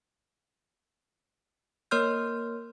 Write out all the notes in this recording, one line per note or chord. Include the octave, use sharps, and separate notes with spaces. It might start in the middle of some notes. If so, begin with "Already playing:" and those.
A#3 A#4 C#5 C6 F6 G6